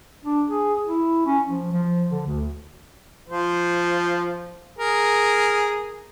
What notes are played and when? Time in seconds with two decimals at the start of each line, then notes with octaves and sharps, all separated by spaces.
0.25 D4
0.49 G#4
0.87 E4
1.27 C#4
1.48 F3
1.73 F3
2.12 D3
2.27 D2
3.29 F3 C5
4.78 G#4 A#4